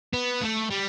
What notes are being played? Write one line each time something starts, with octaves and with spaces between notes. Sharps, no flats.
B3
A3
G3